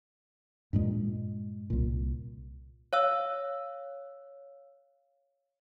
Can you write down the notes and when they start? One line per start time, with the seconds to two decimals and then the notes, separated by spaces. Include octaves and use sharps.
0.73 G2 A#2 G#3
1.70 C2 A#2
2.93 C#5 F5 E6